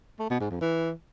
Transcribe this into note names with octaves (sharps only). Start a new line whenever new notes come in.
A3
B2
G#2
F2
E3